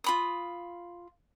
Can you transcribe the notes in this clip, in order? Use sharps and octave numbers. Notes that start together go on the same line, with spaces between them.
F4 B5 D#6